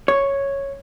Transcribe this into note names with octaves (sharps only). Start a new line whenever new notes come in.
C#5